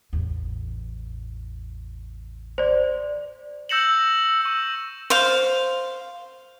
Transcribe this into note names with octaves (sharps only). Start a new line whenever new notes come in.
A1 E2
C5 D5
E6 G6 A#6 C#7 E7 F#7
C#6 E6
C5 F5